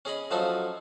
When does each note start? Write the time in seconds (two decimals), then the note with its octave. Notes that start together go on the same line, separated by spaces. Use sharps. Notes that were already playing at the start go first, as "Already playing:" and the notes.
0.05 C#4 G#4 D#5 B5
0.31 F3 F#3 A3 C#4 D#4 F4